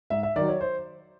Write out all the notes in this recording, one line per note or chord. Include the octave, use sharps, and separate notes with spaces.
G#2 E5
E5
D#3 F#3 D5
C#5
C5